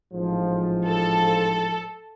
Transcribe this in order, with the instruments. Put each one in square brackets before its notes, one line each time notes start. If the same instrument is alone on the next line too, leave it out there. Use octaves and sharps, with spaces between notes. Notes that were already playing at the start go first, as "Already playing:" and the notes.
[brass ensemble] A1 G#2 F3
[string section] A4